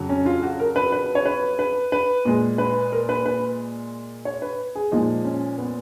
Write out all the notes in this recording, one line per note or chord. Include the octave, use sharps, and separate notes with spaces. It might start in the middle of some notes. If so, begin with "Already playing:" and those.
Already playing: F2 C#3 F#3
C#4
F4
F#4
A#4
B4
B4
C#5
B4
B4
B4
A#2 G#3
B4
A#4
B4
B4
C#5
B4
G#4
A#2 F3 G#3 D#4
C#4
B3